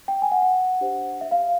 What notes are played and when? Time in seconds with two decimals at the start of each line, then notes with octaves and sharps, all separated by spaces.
0.08 G5
0.22 G#5
0.32 F#5
0.42 F#5
0.81 D4 G4 C5
1.21 E5
1.31 F5